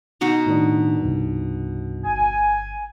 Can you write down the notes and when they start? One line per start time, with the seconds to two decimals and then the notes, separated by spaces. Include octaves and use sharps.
0.21 B2 D#4 F#4
0.46 A2 D#3 D4
1.01 C2 G2
2.05 G1 G#5